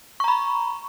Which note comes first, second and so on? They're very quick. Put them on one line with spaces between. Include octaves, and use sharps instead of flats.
C#6 A#5 B5